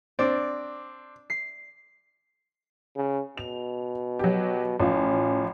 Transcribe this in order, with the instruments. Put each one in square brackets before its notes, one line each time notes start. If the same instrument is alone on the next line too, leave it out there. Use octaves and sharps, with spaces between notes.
[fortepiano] C4 D4 [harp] D5
[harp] C7
[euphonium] C#3
[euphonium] B2 [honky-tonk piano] F7
[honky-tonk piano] F#3 G4
[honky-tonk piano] A1 F3 F4 [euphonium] C#4